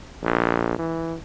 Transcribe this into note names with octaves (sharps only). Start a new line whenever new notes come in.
A#1
E3